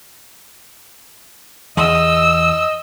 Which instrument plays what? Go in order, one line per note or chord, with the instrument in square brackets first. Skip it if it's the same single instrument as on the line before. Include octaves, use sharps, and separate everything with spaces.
[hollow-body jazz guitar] E2 [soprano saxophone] D#5 [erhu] E6